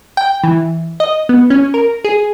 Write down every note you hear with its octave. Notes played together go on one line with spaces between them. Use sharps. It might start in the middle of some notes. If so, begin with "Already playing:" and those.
G5
E3
D#5
B3
C#4
A#4
G#4